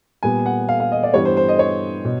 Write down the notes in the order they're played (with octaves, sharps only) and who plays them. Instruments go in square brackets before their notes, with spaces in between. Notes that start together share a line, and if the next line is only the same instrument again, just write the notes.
[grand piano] A#2 G3 B3 G#5
F#5
F5
F5
D#5
D5
G2 E3 G3 B3 C#5
C5
C5
D#5
C#5
B2